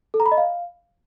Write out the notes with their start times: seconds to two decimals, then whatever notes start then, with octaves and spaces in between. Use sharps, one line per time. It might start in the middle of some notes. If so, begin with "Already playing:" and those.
0.14 A4
0.20 A#5
0.26 B5
0.32 D#5
0.37 F5